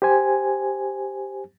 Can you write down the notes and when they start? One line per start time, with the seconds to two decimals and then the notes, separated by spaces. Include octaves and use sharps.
0.02 G4 C5 G#5